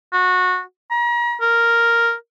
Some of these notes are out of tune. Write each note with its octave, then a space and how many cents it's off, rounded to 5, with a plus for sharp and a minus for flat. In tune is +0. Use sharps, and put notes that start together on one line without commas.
F#4 -20
A#5 +40
A#4 +0